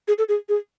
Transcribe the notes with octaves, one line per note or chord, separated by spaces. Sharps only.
G#4
A4
G#4
G#4